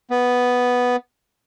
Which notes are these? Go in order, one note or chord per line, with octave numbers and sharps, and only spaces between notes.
B3